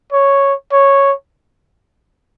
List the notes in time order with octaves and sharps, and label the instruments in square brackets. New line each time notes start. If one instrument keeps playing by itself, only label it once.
[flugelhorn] C#5
C#5